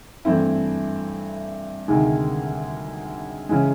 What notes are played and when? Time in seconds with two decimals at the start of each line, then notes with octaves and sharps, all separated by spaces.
0.25 G2 E3 A3 C4 E4
1.88 D2 C3 D#3 G#3
3.49 C#3 E3 G#3